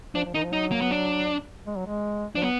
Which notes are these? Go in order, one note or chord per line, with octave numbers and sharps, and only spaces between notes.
F3 D4
F3
D#3 D#4
F3
F#3 D#4
A#3
B3
D4
G#3
F#3
G#3
F3 D4
F#3 B3